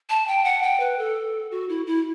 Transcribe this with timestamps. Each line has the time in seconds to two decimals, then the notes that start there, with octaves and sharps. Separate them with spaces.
0.10 A5
0.28 G5
0.44 F#5
0.63 G5
0.80 B4
0.99 A4
1.51 F#4
1.69 E4
1.87 E4